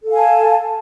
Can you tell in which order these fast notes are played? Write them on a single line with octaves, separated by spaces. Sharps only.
A4 F5 G#5 A5